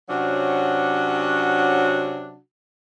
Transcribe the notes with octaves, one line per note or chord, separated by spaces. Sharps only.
C3 F#3 C#4 D4 F#4